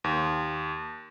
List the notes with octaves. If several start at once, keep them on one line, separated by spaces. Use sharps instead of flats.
D#2